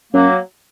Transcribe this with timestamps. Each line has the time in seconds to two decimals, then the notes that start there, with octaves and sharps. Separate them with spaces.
0.13 F#2 F#3 A#3